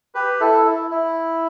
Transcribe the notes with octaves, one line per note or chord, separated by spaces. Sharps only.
G4 B4
E4 A4
E4
E4